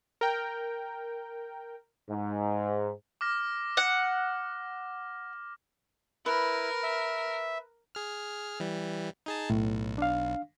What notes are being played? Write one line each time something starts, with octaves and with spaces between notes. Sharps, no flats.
A#4 G5
G#2
D6 F6 A#6
F#5
E4 A#4 B4
E5
G#4 F6
E3 G3
D#4 G#4 A5
B1 A2
D4 F5